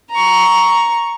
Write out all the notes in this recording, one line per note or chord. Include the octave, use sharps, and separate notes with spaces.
A#5 C#6